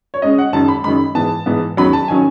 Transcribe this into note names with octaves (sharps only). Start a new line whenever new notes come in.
C#5
C#3 G#3 C#4 D#5
F#5
F#2 D#3 G#3 A5
B5
F#2 D#3 G#3 B5
G#2 E3 B3 A5
G#2 E3 B3
E2 D#3 F#3 C#4 B5
A5
D#3 F#3 C#4 G#5